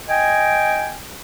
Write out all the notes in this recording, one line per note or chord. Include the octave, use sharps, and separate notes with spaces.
D#5 G5 G#5